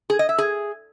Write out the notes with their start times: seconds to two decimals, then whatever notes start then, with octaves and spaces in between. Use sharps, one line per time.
0.10 G#4
0.19 D#5
0.29 E5
0.38 G#4